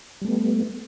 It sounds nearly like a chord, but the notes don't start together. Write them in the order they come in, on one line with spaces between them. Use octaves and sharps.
G3 A3 B3